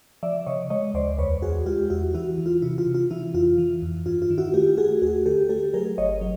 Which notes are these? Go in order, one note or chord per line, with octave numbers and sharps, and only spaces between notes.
F3 D5 E5
C#3 C#5 D#5
G#3 C#5 D#5
D2 C5 D5
E2 B4 C#5
E2 F#4 G#4
G#3 F4 G4
E2 E4 F#4
E3 E4 F#4
E3
F4
C3 E4
F4
C3
F4
E3 E4
F2 F4
E3
F2
G2 F4
F4
D#3
E4 F#4
A3 F4 G4
A3 F#4 G#4
D#2 F#4 G#4
D3 G4 A4
A3 G4 A4
F#3 G#4 A#4
G1 C#5 D#5
F#3